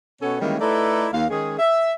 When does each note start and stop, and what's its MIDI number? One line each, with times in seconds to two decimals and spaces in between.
0.21 0.39 47
0.21 0.39 59
0.21 0.39 61
0.21 0.39 69
0.21 0.39 73
0.41 0.56 51
0.41 0.56 52
0.41 0.56 55
0.41 0.56 56
0.41 0.56 58
0.41 0.56 61
0.61 1.07 57
0.61 1.07 63
0.61 1.07 64
0.61 1.07 69
0.61 1.07 71
0.61 1.07 74
1.13 1.25 39
1.13 1.25 77
1.30 1.56 51
1.30 1.56 56
1.30 1.56 61
1.30 1.56 68
1.59 1.92 76